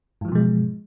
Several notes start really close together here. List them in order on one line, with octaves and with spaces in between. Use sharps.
G#2 E3 F3 B2 G#3